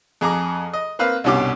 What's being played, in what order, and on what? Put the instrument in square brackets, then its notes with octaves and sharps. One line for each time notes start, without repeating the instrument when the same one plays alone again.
[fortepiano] F2 G#4 A#5 D6
D#5
A#3 C4 B4 F5
C2 G2 B2 C#4 G4 D6